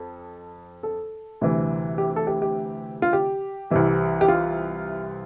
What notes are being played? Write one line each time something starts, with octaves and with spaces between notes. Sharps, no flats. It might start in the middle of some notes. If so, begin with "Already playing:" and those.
Already playing: F2 A4
A4
D2 C3 E3 G3
G4
A4
G4
G4
F4
G4
C2 C3 E3 G3
G4
F4